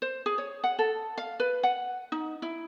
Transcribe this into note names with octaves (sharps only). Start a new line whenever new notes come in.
C5
G#4
C#5
F#5
A4
F5
B4
F#5
D#4
E4